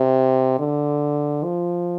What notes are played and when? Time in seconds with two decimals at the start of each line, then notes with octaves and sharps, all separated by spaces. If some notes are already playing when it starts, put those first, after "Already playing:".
Already playing: C3
0.59 D3
1.44 F3